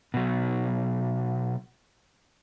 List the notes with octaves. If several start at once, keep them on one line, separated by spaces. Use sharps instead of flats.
B2 F#3